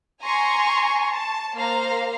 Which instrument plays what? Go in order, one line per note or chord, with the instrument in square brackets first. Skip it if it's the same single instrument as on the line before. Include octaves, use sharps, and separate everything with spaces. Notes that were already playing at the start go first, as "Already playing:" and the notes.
[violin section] G#5 A#5 C6 C#6
A5
A#3 C5 F5 A#5